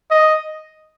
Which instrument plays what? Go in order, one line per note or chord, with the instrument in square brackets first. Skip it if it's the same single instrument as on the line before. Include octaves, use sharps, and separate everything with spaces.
[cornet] D#5